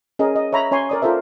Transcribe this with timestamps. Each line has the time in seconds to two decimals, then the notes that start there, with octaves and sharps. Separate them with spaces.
0.19 C#4 G#4 A#4 D#5
0.36 D#5
0.53 C#5 E5 A#5 B5
0.71 C#4 C#5 G#5 C6
0.89 A#4 D5 D#6
1.02 F4 A4 A#4 C5 E5